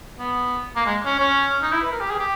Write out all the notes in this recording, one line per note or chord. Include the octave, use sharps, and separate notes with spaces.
B3
A#3
G#3
C#4
C#4
D#4
E4
B4
A#4
G4
G#4
G4